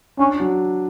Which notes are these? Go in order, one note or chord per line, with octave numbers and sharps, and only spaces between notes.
C#4 D4
F#3